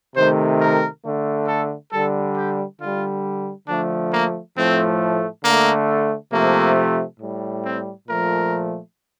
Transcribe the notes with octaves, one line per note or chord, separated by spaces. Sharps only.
C3 D#3 A3 C5
A#4
D3 A3
A4
D3 G3 A4
G4
D3 G3 F4
D3 F3 A3 D4
A#3
A2 F3 A3 C4
D3 A3 A#3
C3 F3 A3 A#3
A2 G3
C4
A#2 F3 A3 A#4